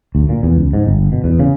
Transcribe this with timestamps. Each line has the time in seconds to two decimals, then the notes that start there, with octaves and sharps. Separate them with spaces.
0.15 D2
0.29 A#2
0.43 E2
0.56 C#2
0.73 G#2
0.87 G1
1.12 B2
1.24 E2
1.39 C#3